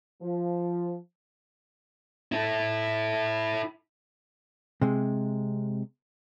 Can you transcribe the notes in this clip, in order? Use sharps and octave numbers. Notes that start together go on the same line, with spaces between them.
F3
E4 A4
C3 G#3